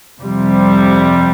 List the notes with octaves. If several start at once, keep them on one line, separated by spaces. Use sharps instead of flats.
F2 C3 G3